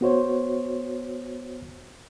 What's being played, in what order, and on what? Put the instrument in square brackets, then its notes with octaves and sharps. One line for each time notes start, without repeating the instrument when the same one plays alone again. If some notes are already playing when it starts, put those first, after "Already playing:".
[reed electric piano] B3 F#4 C5 C#5